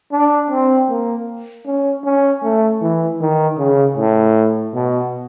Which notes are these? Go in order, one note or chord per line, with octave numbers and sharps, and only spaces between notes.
D4
C4
A#3
C#4
C#4
A3
E3
D#3
C#3
A2
B2